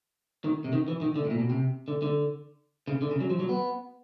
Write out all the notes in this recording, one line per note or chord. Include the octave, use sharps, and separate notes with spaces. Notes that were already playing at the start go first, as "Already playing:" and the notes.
D#3
C3
D#3
E3
D#3
D3
A2
A#2
B2
C3
D3
D3
C#3
D3
C#3
F#3
F3
F#3
B3